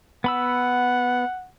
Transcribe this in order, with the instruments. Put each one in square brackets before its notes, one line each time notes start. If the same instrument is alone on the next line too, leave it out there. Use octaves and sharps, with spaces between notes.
[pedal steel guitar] B3 B5 E6 [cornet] F#5